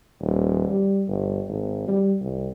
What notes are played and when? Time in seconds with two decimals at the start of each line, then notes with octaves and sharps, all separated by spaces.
0.21 D#1
0.69 G3
1.08 G1
1.49 G#1
1.88 G3
2.21 C2